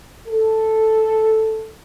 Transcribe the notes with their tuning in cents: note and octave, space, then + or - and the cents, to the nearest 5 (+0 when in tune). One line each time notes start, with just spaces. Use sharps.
A4 +0